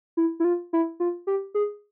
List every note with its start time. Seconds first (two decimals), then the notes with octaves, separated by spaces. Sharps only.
0.17 E4
0.40 E4
0.44 F4
0.73 E4
1.00 F4
1.27 G4
1.55 G#4